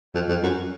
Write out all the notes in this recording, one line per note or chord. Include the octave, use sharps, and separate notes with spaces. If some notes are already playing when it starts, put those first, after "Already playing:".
F2
F2
F#2